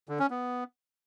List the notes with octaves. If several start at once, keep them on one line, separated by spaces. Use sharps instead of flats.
D3
C#4
B3